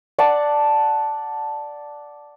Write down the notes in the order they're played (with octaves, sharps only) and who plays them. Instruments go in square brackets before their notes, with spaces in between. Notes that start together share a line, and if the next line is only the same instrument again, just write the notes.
[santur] D5 F#5 A5